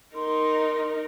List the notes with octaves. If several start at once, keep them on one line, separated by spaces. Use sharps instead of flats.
D#4 A#4 C6